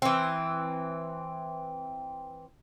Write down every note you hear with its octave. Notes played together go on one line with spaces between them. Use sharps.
E3 C4